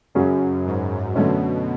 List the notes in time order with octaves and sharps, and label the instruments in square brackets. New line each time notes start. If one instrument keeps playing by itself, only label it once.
[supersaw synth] F#2 [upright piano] C#3 F#3 C#4 G#4
[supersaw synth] G#2
[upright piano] F#2 D3 A3 C#4 [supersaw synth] B2